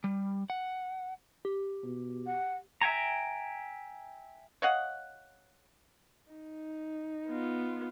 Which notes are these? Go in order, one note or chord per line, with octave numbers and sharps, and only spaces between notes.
G3
F#5
G4
B2
F#5
E5 G5 G#5 A#5
C#5 D#5 F5 F#5
D#4
B3 F4